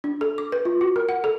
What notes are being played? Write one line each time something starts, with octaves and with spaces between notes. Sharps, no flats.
D4
A4
D6
B4
F4
F#4
A#4
F#5
A4